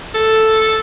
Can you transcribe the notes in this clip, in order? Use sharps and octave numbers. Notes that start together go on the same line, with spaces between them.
A4